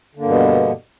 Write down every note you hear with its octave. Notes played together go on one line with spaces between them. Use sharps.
G2 B2 D3 A#3 B3